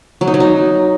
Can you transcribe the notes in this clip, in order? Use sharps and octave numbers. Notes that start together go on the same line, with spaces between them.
F#3
D#4
F#3
D#4